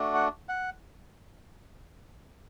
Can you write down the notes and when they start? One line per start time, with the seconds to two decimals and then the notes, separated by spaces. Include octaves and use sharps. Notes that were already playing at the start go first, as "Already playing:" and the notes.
Already playing: A3 D4 F#4
0.14 F#5
0.49 F#5